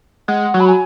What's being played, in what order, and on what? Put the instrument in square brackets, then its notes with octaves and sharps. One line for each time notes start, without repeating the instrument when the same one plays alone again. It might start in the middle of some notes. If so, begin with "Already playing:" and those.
[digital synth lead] G#3 [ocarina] F#5
[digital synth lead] F#3
[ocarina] B5
G#5